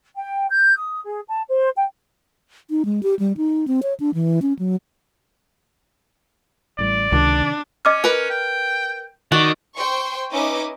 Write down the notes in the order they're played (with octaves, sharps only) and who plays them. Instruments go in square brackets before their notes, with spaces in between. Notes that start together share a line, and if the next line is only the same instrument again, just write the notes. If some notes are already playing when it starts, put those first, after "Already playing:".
[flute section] G5
G6
D#6
G#4
A5
C5
G5
[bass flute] D#4
G#3
G4
G3
D#4
C4
C#5
D4
E3
C#4
F#3
[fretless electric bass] A1 A2 G3 [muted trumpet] D5
[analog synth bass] C#2 [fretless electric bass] C3 D#3 [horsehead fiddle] D4
[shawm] C#4 [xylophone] D#5 D6 F6
[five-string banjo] A#4 B4
[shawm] G5
[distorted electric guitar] D#3 [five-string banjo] F#4 [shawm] D5
[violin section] C5 G5 C6 C#6
C#4 D#4 B4 D#5 E5 D6